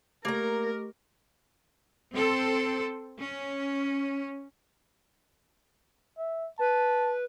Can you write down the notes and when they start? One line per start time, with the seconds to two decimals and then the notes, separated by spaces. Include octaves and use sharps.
0.25 A3 A#3 G4 A#4 A#5 D6
2.13 C4 A4 C5
3.20 C#4
6.18 E5
6.59 B4 A5